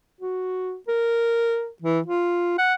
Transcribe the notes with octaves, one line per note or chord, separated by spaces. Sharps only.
F#4
A#4
E3
F4
F#5